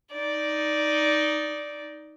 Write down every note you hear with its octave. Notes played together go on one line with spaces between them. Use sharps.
D#4 D5